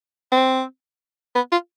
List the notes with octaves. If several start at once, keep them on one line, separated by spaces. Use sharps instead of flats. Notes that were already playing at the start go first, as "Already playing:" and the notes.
C4
B3
F4